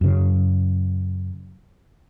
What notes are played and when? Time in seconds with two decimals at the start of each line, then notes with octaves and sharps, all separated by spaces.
0.01 F#2 C#3